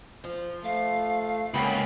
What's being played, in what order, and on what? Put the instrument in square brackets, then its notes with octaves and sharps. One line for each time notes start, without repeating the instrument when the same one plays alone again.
[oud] F3
[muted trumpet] A3 [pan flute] F5
[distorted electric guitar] C#2 [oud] A#3 C#4 F#4 [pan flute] G5 [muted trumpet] B5